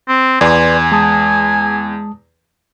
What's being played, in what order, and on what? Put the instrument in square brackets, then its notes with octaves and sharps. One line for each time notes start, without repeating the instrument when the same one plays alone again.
[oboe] C4
[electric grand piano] E2 [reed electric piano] B4 D5 C6 [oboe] G#5
[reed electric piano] G#3 A5 D#6